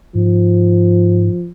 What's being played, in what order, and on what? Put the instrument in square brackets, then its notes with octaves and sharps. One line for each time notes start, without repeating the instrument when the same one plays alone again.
[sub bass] G#2 [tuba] F3